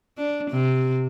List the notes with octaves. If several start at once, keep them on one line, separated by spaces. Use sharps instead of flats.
D4
C3